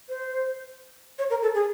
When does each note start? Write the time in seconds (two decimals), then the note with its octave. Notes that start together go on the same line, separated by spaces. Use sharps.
0.09 C5
1.19 C#5
1.30 A#4
1.42 A4
1.55 G#4